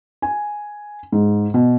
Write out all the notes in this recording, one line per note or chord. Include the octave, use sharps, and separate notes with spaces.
G#5
G#2
B2